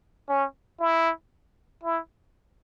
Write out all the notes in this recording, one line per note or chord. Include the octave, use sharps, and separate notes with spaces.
C#4
E4
E4